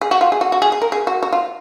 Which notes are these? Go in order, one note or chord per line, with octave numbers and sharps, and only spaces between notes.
G#4
F#4
F4
G#4
F#4
F#4
G#4
G#4
A#4
G#4
F#4
F#4
F4